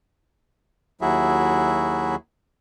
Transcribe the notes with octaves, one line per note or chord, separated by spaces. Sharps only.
D#2 F#3 E4 F#4 G#4 E5